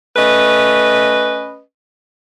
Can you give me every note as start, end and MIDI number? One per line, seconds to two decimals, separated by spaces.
0.16 1.60 57
0.16 1.60 61
0.16 1.60 71
0.16 1.60 75